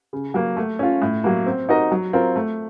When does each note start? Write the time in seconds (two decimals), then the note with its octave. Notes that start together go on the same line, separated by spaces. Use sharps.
0.13 C#3
0.34 F#3 A#3
0.57 A3
0.79 C#4 F4
1.02 A2
1.24 F#3 A#3
1.46 C4
1.69 D#4 F#4 A#4 D#5
1.91 F#3
2.13 C4 F4 A#4
2.36 A3